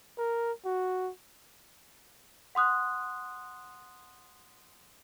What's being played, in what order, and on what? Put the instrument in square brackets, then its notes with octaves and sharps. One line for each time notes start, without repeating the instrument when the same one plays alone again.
[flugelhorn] A#4
F#4
[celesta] F#5 C6 D#6 F#6